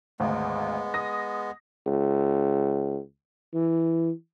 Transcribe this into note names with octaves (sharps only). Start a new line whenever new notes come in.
G#1 D2 G#3 B3
D#6 A#6
C#2
E3